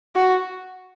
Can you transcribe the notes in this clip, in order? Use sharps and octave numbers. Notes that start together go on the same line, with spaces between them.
F#4